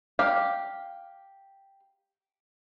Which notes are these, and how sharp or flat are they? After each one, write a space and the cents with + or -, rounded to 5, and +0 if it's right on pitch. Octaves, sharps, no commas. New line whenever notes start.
G4 +0 F5 +0